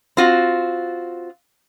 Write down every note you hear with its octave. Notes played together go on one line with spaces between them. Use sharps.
C4 F4 F#4